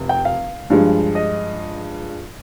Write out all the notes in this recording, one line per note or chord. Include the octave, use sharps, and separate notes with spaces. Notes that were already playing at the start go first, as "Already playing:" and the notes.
Already playing: F1
G5
F5
G2 F3 G#3
D#5